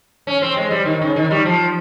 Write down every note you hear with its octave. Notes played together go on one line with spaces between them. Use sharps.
C#4
C4
G#3
G3
D#3
C#3
D#3
G3
F3